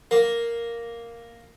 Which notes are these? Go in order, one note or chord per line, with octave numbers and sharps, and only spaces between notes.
A#3